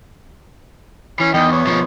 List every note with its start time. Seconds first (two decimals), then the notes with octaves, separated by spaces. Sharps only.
1.20 E3 C#4
1.34 E2 D#3 D#5 G5
1.52 B3 C#5
1.67 B2 F3